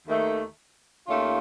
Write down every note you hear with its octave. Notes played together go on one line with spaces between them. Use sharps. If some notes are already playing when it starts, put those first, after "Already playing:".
D#2 D#3 A3
D#2 D#3 A3 C#4 F4